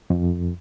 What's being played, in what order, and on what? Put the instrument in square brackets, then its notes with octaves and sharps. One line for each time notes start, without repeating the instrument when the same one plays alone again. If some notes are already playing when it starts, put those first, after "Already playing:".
[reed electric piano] F2